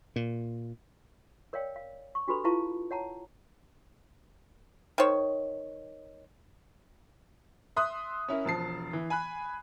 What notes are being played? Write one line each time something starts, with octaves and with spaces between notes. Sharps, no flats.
A#2
A#4 C#5 D5 F5 G5
F5
C#6
D4 F#4 G4 A4 B4 B5
E4 F4 B4 F5 A5 C#6
C#5 F#5 A5 A#5
D#3 C5 C#5
E5 C6 D#6 F#6
C#4 E4 A#4
E1 F3 A5 C7
E3
G#5 B5 F#6